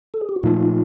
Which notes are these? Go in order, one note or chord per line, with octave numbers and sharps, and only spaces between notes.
A4
G#4
G4
F#4
A#2 F3 A3 D#4 F4